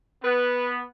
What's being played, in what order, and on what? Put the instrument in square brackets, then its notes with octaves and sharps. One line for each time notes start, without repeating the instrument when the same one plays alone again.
[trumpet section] B3 [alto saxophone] B4